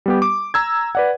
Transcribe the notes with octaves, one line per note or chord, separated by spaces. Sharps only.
G3 B3 G4
D6
A#5 E6 G#6
B4 D5 F#5